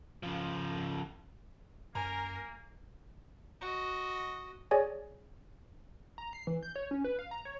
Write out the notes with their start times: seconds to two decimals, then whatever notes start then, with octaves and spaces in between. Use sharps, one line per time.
0.23 C#3 F3
1.95 F#2 A#3 A#4 G#5 A#5
3.61 F#4 D#5
4.71 G#4 C#5 D5 G#5
6.18 A#5
6.33 C7
6.47 E3
6.63 G6
6.76 C#5
6.91 C#4
7.04 B4
7.19 F5
7.31 A#5
7.45 C#5